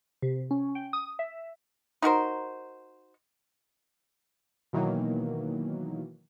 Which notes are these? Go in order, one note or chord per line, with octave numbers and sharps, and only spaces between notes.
C3
C#4
G5
D#6
E5
D#4 F#4 A#4 C5
B2 D#3 E3 F#3 A#3